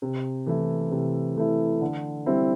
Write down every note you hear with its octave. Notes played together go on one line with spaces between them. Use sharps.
C3
E3 A3 E4
C3
E3 A3 E4
D3
G3 C4 E4